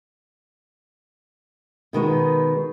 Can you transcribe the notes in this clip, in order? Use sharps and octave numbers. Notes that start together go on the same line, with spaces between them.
B2 D#3 G#3 B3